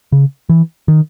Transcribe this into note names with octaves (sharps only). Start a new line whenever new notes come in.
C#3
E3
D#3